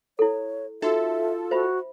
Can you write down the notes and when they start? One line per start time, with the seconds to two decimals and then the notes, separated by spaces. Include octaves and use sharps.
0.19 E4 A4 C#5
0.82 D#4 F4 F#4 A4 E5
1.51 F#4 C5 E5 B5